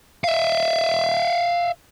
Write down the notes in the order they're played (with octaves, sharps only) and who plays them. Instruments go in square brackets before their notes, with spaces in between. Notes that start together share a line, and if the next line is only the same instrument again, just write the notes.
[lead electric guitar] E5 F5